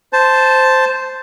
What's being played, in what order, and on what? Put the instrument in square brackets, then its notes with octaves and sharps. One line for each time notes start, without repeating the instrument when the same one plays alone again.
[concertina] C5 A5